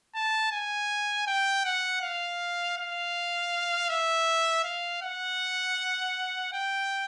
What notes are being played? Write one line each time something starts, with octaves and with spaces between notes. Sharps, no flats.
A5
G#5
G5
F#5
F5
F5
E5
F5
F#5
G5